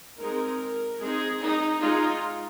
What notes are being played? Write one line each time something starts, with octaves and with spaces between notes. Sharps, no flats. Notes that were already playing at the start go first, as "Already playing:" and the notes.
G#3 C4 D#4 A#4
G#3 C4 D#4 G#4
D#4
G#3 D#4 F4